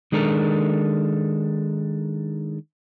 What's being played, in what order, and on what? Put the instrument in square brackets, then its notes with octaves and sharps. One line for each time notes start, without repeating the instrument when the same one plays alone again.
[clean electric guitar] D#3 G#3 D4 A4 A#4